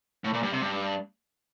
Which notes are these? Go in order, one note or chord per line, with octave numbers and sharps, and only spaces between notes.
A2
A#2
G2
C3
G2